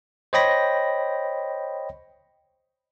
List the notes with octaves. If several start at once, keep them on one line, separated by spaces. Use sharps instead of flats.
C5 C#5 D#5 G5 B5 A#6